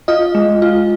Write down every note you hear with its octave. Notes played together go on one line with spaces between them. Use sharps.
F4 D#5
G#3
F4